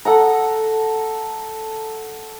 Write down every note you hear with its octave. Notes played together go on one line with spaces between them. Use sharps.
A4 F#5 A#5